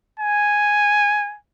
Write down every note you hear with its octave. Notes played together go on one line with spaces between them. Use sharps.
G#5